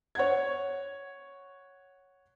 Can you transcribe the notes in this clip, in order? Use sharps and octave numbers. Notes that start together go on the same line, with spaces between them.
C#5 F#5 G#6